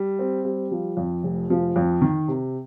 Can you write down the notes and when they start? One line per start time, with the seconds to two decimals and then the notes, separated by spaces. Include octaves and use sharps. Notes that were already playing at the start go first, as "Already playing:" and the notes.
Already playing: G3
0.19 C4
0.45 G3
0.71 F3
0.97 F2
1.23 F1
1.50 F3
1.76 F2
2.02 D#3
2.28 C3